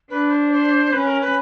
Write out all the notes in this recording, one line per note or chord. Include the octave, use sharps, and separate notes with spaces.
D4 B4
C5
C5
C#4 B4
A#4
B4